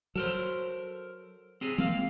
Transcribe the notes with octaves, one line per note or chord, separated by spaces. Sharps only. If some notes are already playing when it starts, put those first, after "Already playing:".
F#3 A4 A#4 C5
C4 G4 G#4
F3 G#3 A#3 C4 F5